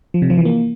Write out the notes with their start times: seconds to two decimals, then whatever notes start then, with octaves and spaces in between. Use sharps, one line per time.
0.14 F3
0.22 C3
0.30 F3
0.38 E3
0.45 A#3